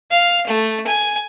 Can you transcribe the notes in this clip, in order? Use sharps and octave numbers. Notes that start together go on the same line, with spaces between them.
F5
A3
G#5